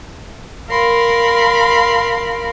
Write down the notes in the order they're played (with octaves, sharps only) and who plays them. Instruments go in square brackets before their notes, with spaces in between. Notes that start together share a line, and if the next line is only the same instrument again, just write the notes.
[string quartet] A#4 F5 B5 C6